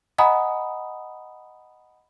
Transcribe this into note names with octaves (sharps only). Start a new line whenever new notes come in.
D#5 F#5 G#5 A#5 B5 D#6